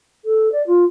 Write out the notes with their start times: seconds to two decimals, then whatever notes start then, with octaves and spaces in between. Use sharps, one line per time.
0.25 A4
0.52 D5
0.67 F4